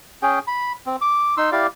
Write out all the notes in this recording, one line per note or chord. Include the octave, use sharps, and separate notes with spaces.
C#4 G#4 G5
B5
C4
D6
D#4 C6 E6
E4 G4 D5 F5